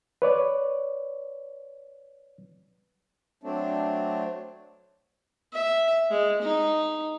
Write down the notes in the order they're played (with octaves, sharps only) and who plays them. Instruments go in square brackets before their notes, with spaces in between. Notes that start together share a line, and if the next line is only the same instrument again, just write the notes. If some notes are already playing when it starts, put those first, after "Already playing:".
[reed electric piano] B4 C#5 D5
[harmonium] F#3 A3 C4 D4
[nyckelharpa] E5
G#3
D#4